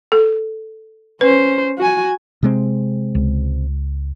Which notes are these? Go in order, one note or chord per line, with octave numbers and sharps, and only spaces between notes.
A4
C#4 B4 C5
F#4 G#5
C3 G#3 C4
C#2